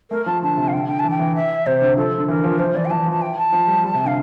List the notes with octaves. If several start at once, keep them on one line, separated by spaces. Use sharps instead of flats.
A3 A#4
F3 A5
D3 A5
C3
F5
D3 G5
D3 G5
E3 A5
G5
E3
E5
C3 C5
D3
F3 A4
D3
E3 A#4
F3
F3 C5
E3 D5
G5
E3 A5
F3 A5
G5
A5
F3
G3
G3
C3
D3 F5